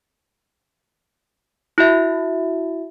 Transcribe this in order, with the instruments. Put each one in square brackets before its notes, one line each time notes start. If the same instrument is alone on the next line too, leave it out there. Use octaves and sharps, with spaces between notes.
[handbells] E4 F#4 E5